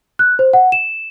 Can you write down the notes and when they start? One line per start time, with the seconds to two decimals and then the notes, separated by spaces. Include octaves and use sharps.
0.19 F#6
0.39 C5
0.53 F#5
0.72 E7